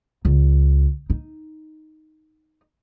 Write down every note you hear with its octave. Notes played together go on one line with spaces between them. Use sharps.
C#2
D#4